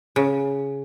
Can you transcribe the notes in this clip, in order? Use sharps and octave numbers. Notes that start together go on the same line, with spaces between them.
C#3